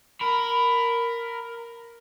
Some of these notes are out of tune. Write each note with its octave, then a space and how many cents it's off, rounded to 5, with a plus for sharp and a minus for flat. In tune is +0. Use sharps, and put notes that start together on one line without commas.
A#4 +0 B5 +10